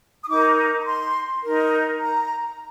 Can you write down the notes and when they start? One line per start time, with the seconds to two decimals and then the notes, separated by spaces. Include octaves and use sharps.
0.22 D#6
0.28 D#4 A#4 D6
0.79 A#5
0.86 C6
1.43 D#4 A#4
1.99 A#5